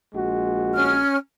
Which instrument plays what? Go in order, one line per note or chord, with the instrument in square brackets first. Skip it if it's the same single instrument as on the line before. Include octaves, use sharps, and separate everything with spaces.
[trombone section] A#1 G#3 F#4
[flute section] C#4 F6